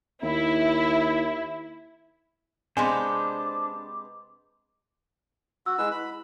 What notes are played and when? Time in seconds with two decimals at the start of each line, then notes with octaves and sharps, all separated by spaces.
0.23 D#2 E4
2.77 C3 G#3 B3 D4 C5 G#5 C6 D6
5.66 F#4 E6
5.78 G#3 E4 B4 E6
5.92 B5